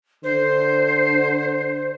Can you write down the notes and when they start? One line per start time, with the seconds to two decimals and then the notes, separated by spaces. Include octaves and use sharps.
0.24 D3 C5